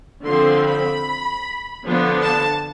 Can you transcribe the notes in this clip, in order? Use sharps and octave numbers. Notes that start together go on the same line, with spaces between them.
D3 F3 C4 C6
B5
D3 F3 B3 D4
A5